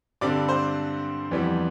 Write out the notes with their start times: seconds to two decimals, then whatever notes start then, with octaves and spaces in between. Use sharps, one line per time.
0.21 G2 D3 G3 C4 D5 D6
0.48 C5 C6
1.31 F2 E3 G3 B3